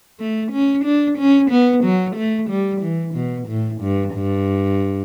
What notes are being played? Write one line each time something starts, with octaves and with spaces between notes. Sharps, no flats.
A3
C#4
D4
C#4
B3
F#3
A3
G3
E3
B2
A2
G2
G2